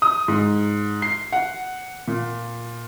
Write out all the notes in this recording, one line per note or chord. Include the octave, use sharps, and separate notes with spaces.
D#6
G#2
C7
F#5
A#2